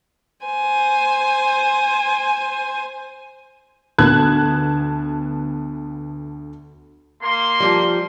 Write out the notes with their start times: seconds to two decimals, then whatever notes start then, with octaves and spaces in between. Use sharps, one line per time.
0.46 C5 G#5
3.98 D2 B3 A5 F#6 G#6
7.21 A#3 C6
7.60 F3 G3